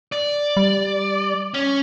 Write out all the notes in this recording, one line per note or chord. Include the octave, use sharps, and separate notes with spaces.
D5
G3
C#4